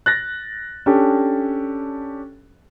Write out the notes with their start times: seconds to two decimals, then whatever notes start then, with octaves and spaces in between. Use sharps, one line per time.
0.06 F#6 A6 A#6
0.86 C#4 D4 G4 A4